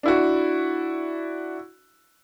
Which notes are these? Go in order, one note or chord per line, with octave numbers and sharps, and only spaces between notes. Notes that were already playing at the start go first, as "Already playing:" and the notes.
D4 E4 F#4